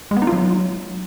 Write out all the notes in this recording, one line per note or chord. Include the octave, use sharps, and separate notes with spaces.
G#3
B3
D#4
F4
F#3